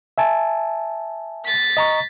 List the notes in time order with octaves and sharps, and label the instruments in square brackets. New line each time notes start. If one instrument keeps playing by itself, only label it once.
[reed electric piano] E5 G#5 A5
[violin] A6 B6
[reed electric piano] D#5 A#5 C#6